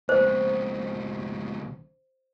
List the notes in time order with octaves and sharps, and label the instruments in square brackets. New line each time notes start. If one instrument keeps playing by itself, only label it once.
[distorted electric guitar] C#2 B2 [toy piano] C5